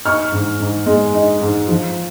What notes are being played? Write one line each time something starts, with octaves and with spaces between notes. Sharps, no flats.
D#4 C#6 F6
G#2
G#2
G#3
D#4
G#2
F3